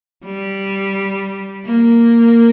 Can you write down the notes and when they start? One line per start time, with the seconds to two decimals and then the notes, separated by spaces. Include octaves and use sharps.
0.25 G3
1.66 A#3